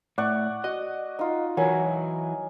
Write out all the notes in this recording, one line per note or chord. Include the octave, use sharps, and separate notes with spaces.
A2 D5 F#5 C#6
F#4 D#5
D#4 F4
E3 F#3 E4 F#4 A#4 G#5